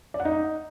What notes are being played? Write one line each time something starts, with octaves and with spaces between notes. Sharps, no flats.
D5
F#5
D#4